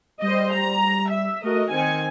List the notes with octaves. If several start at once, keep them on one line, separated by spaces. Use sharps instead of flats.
G3 C5 D#5
G3 A#5
E5
A3 F#4 A#4 D#5
D#3 C4 G#5 C#7